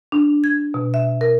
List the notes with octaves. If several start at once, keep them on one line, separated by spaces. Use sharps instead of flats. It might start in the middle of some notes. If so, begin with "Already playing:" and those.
D4
G#6
B2
E5
A#4